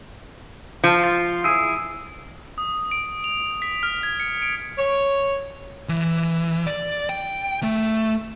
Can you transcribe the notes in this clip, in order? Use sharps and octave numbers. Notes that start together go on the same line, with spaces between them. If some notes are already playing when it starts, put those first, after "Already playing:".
F3
F4
E4 G#4
D#6
D7
F7
B6
F6
G#6
C#7
D7
C#5
E3
D5
G5
A3